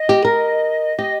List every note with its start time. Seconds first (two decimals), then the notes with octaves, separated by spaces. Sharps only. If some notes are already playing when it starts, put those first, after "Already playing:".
Already playing: D#5
0.09 G4
0.25 A#4
0.99 G4 D#5